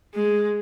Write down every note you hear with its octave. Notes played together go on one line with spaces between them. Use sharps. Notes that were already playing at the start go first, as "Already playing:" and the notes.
G#3